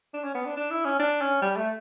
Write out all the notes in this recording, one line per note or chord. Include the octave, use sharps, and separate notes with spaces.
D4
C#4
B3
D4
D4
E4
C#4
D4
C#4
G3
A3